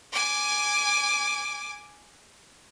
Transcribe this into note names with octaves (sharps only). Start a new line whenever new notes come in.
G#5 D6